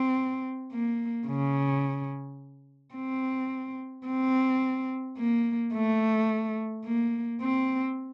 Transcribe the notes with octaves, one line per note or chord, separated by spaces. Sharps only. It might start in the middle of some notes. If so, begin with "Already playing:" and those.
Already playing: C4
A#3
C#3
C4
C4
A#3
A3
A#3
C4